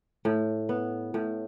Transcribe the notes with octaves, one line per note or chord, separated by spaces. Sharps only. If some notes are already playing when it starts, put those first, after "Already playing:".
A2
B3
A2